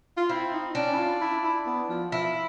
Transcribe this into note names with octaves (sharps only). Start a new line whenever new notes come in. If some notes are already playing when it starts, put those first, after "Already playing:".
F4
C4 E4
D#4
C#4 D4
E4
F4
E4
E4
B3
F3
F3 E4